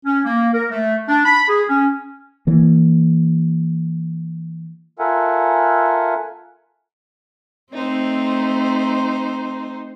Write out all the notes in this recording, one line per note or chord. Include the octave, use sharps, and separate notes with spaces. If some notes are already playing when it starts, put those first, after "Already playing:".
C#4
A#3
A#4
A3
D4
B5
G#4
C#4
E3 A#3
F4 A4 A#4 E5 F#5 G#5
A3 C4 D#4 C5